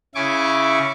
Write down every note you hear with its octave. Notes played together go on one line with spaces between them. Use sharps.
C#3 E4 G#5 C#6 D6